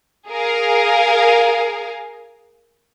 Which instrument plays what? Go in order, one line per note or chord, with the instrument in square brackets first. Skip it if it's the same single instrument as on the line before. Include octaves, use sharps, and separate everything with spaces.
[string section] G#4 A#4 F5